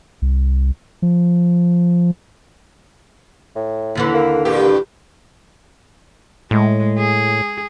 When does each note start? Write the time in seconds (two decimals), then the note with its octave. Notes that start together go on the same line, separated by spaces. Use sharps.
0.22 C2
1.02 F3
3.55 A2
3.95 D#2 D3 E3
4.14 A#3
4.45 G2 A#2 A#3 G4
6.51 A2 G#3
6.98 G#4